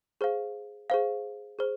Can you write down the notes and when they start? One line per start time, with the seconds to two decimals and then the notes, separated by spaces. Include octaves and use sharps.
0.21 G#4 C5 F5
0.90 G#4 C5 F5
1.59 G#4 C5